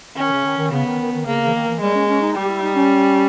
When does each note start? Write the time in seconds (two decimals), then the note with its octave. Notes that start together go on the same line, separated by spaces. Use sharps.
0.16 D#3 C#4
0.30 C#3
0.44 D#3
0.57 D#3
0.71 C#3 B3
0.85 D#3
0.99 D#3
1.12 D#3
1.25 C#3 A#3
1.40 C#3
1.46 E3
1.53 D#3
1.67 E3
1.80 G3 G#3
1.94 C#4
2.07 C#4
2.21 D#4
2.35 G3 G4
2.48 E4
2.62 D#4
2.75 C#4